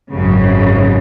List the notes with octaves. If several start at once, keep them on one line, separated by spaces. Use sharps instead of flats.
G#1 F#2 C#3